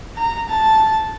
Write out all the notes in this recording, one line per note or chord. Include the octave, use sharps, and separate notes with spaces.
A#5
A5